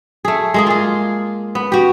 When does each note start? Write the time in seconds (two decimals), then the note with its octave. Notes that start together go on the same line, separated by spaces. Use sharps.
0.25 A3 G#4
0.54 G#3 A#3 G#4
0.67 F4 G#4
1.55 B3
1.72 F#4 G4